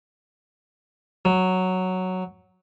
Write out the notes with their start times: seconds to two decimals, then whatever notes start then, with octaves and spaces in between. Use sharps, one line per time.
1.25 F#3